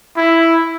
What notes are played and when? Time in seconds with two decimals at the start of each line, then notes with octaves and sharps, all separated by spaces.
0.16 E4